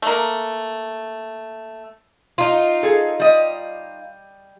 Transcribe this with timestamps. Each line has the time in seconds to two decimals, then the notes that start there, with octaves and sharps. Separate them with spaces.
0.02 A3 A#3
2.38 D#4 F4
2.83 G#4 A4
3.20 G3 D#5